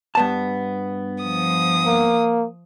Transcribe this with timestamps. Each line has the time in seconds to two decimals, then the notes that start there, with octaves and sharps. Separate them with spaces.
0.15 G2 B3 A5
1.23 F3 D#6
1.86 A#3